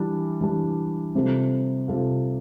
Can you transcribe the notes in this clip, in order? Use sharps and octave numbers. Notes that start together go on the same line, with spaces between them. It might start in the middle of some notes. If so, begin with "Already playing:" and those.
Already playing: E3 G3 D4
E3 G3 D4
C3 G3 C4 F4 A4
C3 G3 C4 F4 A4